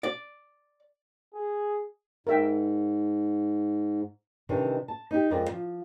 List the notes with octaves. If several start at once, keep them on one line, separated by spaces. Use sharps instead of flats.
D5
G#4
G#2 A#4 E5 G5
C3 D#3 E3 G3 C#4 D4
A5
D#4 G4
F2 G#3 A#4 C5 D5 G5
F3